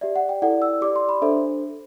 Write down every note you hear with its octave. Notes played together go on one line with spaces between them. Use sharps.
G4 D5 E5
F#5
G5
E4 A4 D5 F#5
E6
G4 D5 D6
C6
B5
D4 A4 C5 E5